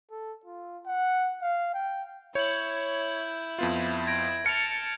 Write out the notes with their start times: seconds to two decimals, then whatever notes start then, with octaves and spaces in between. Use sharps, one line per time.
0.11 A4
0.45 F4
0.86 F#5
1.42 F5
1.74 G5
2.35 E4 C#5 G6 F#7
3.59 F2 B3 F4
4.07 G#6 A#6 D7
4.46 A5 F6 A6 C#7 F7